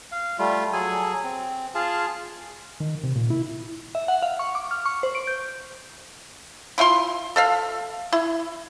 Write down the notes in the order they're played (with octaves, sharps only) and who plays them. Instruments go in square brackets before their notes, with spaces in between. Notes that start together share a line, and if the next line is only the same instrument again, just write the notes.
[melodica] F5
G3 A3 F4
F#3 G#4 A4 G#5
C4
F4 G#4 F5 A5
[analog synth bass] D#3
C3
A#2
E4
[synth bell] E5
F#5
F5
C#6
D6
F6
C#6
C5
D7
G6
[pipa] E4 F4 E5 C6
A4 E5 F5
E4